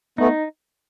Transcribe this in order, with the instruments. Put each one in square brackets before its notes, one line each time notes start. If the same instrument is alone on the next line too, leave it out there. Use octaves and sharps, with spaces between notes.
[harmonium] A3 B3 [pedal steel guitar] D#4